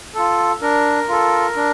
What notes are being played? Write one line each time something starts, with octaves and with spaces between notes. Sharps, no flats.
F4 A4
D4 A#4
F4 A4
D4